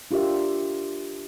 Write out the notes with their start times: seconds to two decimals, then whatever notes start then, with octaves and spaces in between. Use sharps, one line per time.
0.11 D4 F4 G4 A#4 E5